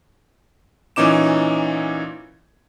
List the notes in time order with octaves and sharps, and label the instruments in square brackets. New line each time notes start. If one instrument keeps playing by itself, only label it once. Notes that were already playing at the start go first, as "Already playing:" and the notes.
[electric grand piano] A#2 E3 C#4 D#4 D6 E7